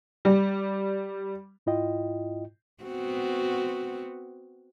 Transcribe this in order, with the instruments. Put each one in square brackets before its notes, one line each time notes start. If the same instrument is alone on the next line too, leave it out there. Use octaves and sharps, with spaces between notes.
[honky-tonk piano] G3
[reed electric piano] G#2 E4 F4 D#5 G5
[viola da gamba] B3 C4 F#4